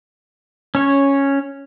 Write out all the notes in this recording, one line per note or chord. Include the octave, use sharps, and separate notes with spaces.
C#4 C#5